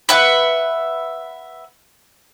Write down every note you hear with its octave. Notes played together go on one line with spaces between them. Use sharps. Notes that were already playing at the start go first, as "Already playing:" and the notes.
B4 E5 F#5